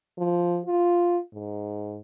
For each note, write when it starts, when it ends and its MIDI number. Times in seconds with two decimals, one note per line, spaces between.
0.18 0.61 53
0.66 1.18 65
1.33 2.00 44